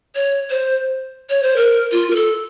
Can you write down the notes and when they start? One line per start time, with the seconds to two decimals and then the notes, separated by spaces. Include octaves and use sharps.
0.15 C#5
0.50 C5
1.30 C#5
1.43 C5
1.57 A#4
1.92 F4
2.11 A#4
2.16 A4